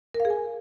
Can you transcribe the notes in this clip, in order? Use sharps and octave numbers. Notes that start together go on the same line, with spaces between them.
A#4
F5
G#4
G#5